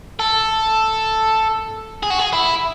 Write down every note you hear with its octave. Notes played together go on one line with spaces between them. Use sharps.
A4
G#4
F#4
G#4
E4